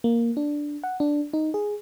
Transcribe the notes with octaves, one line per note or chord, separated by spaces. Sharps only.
A#3
D4
F#5
D4
D#4
G#4